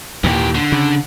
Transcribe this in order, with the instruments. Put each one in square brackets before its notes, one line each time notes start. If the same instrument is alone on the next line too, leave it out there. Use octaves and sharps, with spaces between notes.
[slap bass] D#2 A#2 [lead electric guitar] E3 G4
[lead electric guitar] D3
[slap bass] C#3